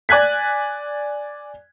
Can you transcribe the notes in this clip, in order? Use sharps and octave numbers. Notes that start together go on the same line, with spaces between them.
D5 G#5 F#6 G#6 B6